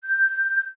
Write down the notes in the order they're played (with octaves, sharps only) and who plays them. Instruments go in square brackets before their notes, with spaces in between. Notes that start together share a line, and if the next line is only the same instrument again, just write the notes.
[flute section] G6